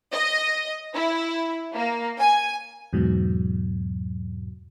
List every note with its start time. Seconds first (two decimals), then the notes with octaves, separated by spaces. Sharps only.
0.13 D#5
0.93 E4
1.73 A#3
2.19 G#5
2.93 E2 G#2 B2 F#3